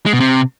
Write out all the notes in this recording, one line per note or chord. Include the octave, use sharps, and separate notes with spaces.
G#3
B2
C3